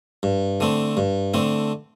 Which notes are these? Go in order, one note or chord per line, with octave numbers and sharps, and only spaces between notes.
G2
D3 A3 C4
G2
D3 A3 C4